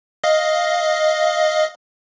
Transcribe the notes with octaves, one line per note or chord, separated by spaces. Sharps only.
D#5 F5